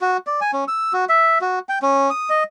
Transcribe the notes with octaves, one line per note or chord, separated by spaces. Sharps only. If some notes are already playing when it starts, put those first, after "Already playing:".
F#4
D5
G#5
C#4
E6
F#4
E5
F#4
G5
C#4
D#6
D#5